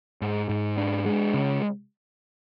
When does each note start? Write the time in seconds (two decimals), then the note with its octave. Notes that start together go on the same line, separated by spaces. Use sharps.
0.22 G#2
0.49 G#2
0.77 D4
1.05 G#3
1.34 C#3